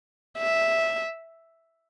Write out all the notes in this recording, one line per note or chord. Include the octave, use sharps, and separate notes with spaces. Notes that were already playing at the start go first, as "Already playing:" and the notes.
E5